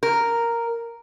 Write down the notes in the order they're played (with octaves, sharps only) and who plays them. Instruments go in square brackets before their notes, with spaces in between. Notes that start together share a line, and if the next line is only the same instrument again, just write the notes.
[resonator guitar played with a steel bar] A#4